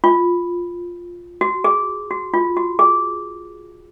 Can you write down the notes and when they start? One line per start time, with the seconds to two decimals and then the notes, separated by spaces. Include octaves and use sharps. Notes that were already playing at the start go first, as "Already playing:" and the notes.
0.04 F4
1.41 F#4
1.64 G#4
2.11 F#4
2.34 F4
2.57 F#4
2.79 G#4